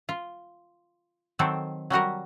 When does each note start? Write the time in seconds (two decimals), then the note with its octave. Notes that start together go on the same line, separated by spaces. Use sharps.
0.09 F4
1.39 D#3 F#3 C4 A4
1.90 F#3 G3 F#4 A#4